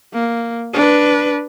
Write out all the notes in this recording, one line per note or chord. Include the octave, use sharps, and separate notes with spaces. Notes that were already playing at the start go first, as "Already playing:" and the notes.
A#3
D4 B4